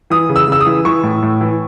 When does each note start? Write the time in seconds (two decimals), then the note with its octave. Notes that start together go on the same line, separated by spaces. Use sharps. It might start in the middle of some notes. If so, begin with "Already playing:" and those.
0.10 E3 D#6
0.29 C#3
0.36 E6
0.48 C#3 E6
0.61 D#6
0.66 E3
0.85 E3 C#6
1.03 A2
1.22 A2
1.41 E3